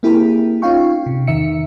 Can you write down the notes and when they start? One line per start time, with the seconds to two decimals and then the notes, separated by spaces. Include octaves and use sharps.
0.03 A#3 C4 E4 G4 G#4 A#4
0.62 C#4 D#4 F4 F5 G5 C#6
1.06 C3
1.27 E2 D#3 E5 C#7